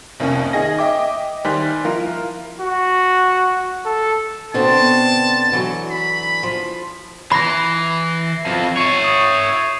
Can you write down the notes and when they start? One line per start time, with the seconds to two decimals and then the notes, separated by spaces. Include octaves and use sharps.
0.20 C2 F2 A#3 C#4
0.53 D#3 G#4 D#5 A#6
0.79 D#5 E5 G5 D6
1.45 D#3 G3 C5 G#5 F#6 B6
1.85 F3 E4 F4 A#4
2.60 F#4
3.86 A4
4.54 B2 D3 C4 A5
5.52 D3 E3 F#3
5.90 B5
6.43 F3
7.32 E3 B5 A#6 C7
8.46 F3 C4
8.77 C#5 E5 C#6 C7
9.04 D#6